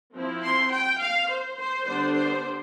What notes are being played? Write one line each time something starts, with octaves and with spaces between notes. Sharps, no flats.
F3 C4 E4
C6
G5
F5
C5
C5
D3 G3 B3 D4 C5
C5